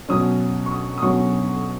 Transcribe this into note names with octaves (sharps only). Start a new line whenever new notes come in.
B2 F#3 C#4 D#6
C#6
D#6
D#6
B2 F#3 C#4 C#6